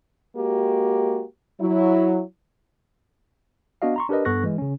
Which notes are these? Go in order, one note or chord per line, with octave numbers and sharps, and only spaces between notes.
G#3 A#3 F#4 G4
F#3 E4
B3 D4 F#4 D#5 F5
A#5 C6 C#6
D4 G4 A#4 B4 D#5
G2 B3 A4 C#6 F#6 A#6
E3 G#3
C#3 C#4